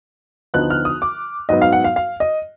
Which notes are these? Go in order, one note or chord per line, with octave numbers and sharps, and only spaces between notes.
D2 D3 F3 B3 D#4 F#6
F6
D#6
D6
G#2 F#3 B3 D#4 D#5
F5
F#5
F5
F5
D#5